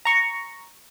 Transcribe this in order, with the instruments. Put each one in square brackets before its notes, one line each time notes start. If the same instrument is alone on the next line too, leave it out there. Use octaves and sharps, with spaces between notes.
[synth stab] A#5 C#6